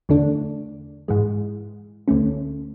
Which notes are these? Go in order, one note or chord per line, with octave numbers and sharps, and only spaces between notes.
E2 D3 A3 D4
G#2 E3 G#3
D2 D3 A3 C#4